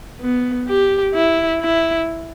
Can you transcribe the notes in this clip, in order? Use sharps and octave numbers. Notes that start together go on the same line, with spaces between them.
B3
G4
E4
E4